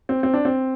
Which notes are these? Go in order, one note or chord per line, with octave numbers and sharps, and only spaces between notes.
C4
C4
D4
C4